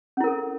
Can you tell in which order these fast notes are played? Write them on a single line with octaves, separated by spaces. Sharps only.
C#4 E4 A#4 A4